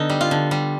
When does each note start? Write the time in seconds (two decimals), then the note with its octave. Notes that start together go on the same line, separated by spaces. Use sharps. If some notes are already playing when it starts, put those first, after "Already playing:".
Already playing: D3 B3 D#4
0.10 G3
0.21 F4
0.31 D3
0.51 G3